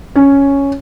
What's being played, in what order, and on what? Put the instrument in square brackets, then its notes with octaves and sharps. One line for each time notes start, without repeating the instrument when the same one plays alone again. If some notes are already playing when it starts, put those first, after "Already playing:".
[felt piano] C#4